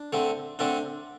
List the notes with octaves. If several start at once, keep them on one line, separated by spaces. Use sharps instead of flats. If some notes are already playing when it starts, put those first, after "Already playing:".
Already playing: D4
D3 A3 C4
D3 A3 C4 D4